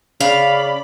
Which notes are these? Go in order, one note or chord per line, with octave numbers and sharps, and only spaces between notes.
C#3 D5 F5 B5